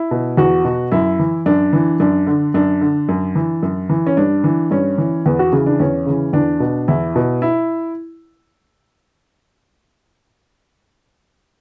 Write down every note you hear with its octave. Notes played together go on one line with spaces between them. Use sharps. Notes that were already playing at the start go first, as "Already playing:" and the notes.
Already playing: E4
B2
E2 F#4
B2
F#2 E4
E3
F#2 D4
E3
F#2 D4
D3
F#2 D4
D3
F#2
E3
F#2
E3
C#4
G2 D4
E3
G2 C#4
E3
E2 B3
F#4
C#3 E3
D4
E2 C#4
C#3 E3
E2 D4
B2
E2 E4
B2
E4